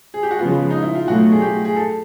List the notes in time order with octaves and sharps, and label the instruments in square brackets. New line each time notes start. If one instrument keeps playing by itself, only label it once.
[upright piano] G#4
G4
F#4
[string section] C#3 F3 G#3 B3 [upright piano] F4
[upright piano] D#4
E4
F4
[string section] B2 F#3 A3 [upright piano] F#4
[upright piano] G#4
G4
G#4
A4